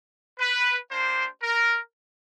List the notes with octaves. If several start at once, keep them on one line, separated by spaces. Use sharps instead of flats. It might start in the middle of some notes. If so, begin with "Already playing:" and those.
B4
A#3 D4 G4 C5
A#4